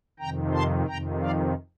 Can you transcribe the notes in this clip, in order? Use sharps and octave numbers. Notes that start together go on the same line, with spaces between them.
F2 C3 D#3 G5 A#5
A5 C6
F2 C3 D#3 G5 A#5
D5 F5